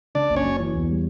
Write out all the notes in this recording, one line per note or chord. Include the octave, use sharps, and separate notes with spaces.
C#3 D4 D5
F#1
C#4 C#5
F#3
E3
E2
G3